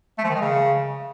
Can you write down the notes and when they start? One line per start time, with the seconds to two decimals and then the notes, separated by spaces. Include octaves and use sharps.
0.18 A3
0.24 F3
0.30 D#3
0.35 G#3
0.41 C#3